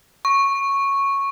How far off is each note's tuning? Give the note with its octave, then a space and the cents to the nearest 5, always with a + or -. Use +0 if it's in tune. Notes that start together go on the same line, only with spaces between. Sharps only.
C#6 -5